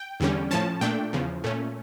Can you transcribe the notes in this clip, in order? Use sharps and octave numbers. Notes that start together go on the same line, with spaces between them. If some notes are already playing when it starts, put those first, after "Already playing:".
Already playing: G5
E2 D3 G3 C#4
A2 F3 C#4 A5
A#2 A3 D4 G5
E2 C#3 F3
A#2 A3 C#4